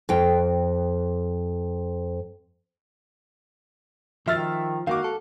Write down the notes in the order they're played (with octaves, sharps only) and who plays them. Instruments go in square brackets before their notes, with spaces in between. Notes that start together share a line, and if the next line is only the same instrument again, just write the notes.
[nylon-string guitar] F2 G5
[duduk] D#3 [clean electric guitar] F3 [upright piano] E5 F6 A6
[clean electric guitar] D#3 A#3 [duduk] F#4 [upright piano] F5 D6
[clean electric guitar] A4